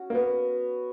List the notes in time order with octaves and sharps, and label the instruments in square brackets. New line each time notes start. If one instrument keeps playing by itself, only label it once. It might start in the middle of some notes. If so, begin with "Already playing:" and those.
Already playing: [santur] C#4 F#4
[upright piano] A#3
B3